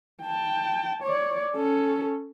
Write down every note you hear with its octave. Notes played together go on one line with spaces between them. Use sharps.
G5 A5
C#5 D5
C#4 A4